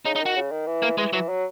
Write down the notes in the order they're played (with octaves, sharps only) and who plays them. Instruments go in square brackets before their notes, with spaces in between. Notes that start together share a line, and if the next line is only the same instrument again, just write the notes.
[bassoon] C#3 [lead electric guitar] D#4
[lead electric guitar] D#4
[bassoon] D#3
[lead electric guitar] F#4
[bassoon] C#3
D#3
E3
[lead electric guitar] A#3
[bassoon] E3 [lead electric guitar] G#3
[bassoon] E3 [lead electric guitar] F#3
[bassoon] F#3